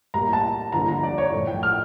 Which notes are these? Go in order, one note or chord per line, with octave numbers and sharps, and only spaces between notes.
A2 G3 A#3 A#5
A5
G2 D3 F3 A#3 A#5
A#5
D5
C#5
A2 F3 A3
G5
F6